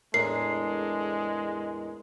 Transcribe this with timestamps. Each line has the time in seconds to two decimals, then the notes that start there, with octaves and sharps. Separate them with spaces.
0.14 E2 A2 G#3 D4 A#4 C7